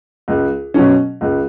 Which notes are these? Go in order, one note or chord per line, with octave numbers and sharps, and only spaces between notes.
C#2
B2 F#3 C#4
C#2